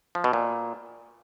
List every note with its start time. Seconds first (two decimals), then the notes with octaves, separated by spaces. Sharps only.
0.15 F3
0.24 B2
0.33 A#2